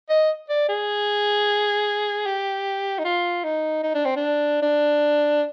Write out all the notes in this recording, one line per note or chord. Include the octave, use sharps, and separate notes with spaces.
D#5
D5
G#4
G4
D#4
F4
D#4
D#4
D4
C4
D4
D4